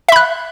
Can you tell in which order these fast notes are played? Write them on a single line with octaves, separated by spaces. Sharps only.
E5 B5 F#6